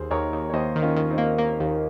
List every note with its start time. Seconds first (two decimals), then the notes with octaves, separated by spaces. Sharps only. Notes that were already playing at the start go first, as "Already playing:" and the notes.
Already playing: D#2 G#4 C5
0.11 D#2 A#4 C#5
0.33 D#2
0.50 C#5
0.53 D#2 C5 D#5
0.76 D#3
0.82 C#4 F4
0.96 D#3
1.10 C4 D#4
1.18 A#3
1.38 A#3
1.60 D#2